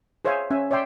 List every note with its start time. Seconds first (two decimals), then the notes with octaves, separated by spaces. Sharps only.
0.25 G#4 C5 C#5 E5 F5 G#5
0.51 C#4 E5 G#5
0.71 C#5 D5 E5 G5 C6